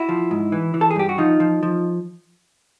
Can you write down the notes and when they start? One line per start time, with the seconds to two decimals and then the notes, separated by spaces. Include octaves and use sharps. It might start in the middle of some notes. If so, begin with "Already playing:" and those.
Already playing: E4 F#4
0.09 F3
0.31 G#2
0.52 E3
0.74 E3
0.81 A4
0.91 G#4
0.96 G2 G4
1.09 F#4
1.18 F3 D#4 F4
1.40 F3
1.63 F3